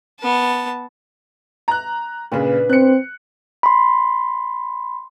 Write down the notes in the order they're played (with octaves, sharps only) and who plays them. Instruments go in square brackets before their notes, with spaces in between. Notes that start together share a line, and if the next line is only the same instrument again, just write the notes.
[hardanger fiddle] B3 A5
[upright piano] A#5 F#6
[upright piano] A#2 C#3 [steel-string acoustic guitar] D4 B4
[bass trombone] C4 [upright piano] F#6 C#7
[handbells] B5 C6